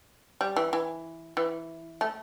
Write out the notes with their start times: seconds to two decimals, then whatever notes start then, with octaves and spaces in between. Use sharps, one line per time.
0.41 G3
0.56 E3
0.73 E3
1.37 E3
2.01 A3